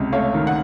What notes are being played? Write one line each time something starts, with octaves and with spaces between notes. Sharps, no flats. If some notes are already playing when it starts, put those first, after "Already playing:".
Already playing: C#2 C3
A3 C#5 F5
D#3
F#5